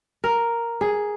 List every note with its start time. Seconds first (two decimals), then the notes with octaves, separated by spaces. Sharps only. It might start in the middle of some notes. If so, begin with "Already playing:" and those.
0.24 A#4
0.81 G#4